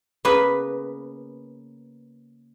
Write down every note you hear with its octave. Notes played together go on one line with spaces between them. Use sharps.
C#3 A#3 B3 B4